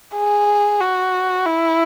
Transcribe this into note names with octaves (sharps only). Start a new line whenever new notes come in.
G#4
F#4
E4